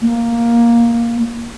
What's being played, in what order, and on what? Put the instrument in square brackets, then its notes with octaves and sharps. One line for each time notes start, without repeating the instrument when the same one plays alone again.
[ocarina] A#3